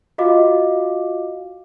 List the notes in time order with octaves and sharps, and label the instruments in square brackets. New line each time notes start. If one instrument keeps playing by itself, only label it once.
[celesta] F4 F#4 D#5 F5 D6